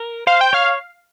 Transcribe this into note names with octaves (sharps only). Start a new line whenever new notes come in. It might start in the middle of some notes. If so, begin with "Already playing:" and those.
Already playing: A#4
C5 F5
G5
C#5 F5